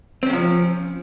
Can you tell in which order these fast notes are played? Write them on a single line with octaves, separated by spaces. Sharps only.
C4 C#4 C3 F3